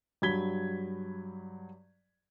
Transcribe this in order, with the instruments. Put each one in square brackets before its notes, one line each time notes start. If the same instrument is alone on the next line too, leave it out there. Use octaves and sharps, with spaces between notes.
[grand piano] G2 F#3 B5 G#6 B6 G7